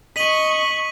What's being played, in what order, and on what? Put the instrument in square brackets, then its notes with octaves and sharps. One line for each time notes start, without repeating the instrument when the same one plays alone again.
[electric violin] D#5 C#6 [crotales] B6 D#7 F#7